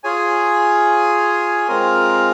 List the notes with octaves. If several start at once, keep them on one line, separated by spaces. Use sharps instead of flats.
F4 G#4 C#5 G#5
G#3 C4 F4 A#4